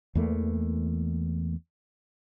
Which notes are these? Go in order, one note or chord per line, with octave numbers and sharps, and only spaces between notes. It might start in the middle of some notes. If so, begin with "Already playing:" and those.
E2 E3 A3 A#3